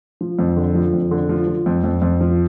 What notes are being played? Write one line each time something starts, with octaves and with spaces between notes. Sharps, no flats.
F3
F2
D3
F3
F2
D3
F3
F3
F2
F2
F2
F3